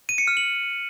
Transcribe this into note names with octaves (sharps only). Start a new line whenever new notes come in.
D#7
C#7
F6
F#7